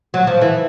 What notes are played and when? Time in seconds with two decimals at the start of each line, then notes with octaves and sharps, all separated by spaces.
0.14 F#3
0.27 F3
0.41 E3